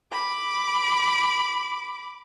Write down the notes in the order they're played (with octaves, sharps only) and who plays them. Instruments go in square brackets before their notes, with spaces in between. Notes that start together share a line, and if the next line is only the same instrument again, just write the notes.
[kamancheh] B5 D6